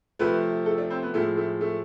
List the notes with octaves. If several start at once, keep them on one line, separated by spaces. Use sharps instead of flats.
C3 F3 A3 B4
A4
D4
C4
B3
A2 F3 G#3 A3
A3
A3